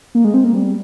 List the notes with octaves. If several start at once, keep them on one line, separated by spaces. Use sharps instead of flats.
A#3
G#3
C4
A#3
G3